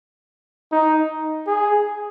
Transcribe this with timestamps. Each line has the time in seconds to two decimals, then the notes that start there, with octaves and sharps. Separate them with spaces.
0.72 D#4
1.47 G#4